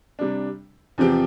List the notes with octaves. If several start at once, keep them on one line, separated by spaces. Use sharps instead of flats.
C3 G3 D4
E2 C3 F3 C4 G4